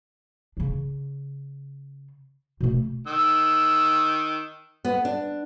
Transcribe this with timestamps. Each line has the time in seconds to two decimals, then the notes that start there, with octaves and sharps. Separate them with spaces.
0.57 C#3 D4
2.61 B2 A3
3.07 D#3 E6
4.85 B3
5.05 D4